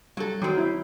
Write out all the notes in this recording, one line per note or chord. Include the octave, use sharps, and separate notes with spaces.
F#3 G3 A4
D#3 F#3 C4
E4